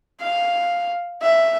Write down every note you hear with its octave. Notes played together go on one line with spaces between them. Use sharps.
F5
E5